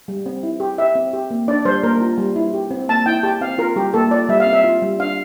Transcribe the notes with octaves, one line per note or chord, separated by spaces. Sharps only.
G3
C4
E4
G4
G4 E5
C4
G4
A#3
D4 D5
G3 C5
A#3 A#4
F4
G3
E4
G4
C4
A#3 A5
E4 G5
G4 A5
C4 F5
F4 A#4
G3 G4
A#3 A4
F4 D5
G3 E5
F5
C4
E5
F4
G3
D4 F5